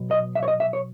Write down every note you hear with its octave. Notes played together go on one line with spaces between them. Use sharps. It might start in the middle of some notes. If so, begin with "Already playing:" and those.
Already playing: B2 F#3
D#5
E5
C#5
D#5
E5
C#5